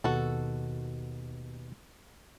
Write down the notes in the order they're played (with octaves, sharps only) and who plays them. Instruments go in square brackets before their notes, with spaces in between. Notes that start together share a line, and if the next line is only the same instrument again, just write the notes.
[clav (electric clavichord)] D#2 B2 [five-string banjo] F#4 A4